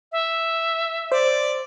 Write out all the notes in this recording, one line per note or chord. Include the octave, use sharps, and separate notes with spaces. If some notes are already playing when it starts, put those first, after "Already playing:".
E5
C5 D5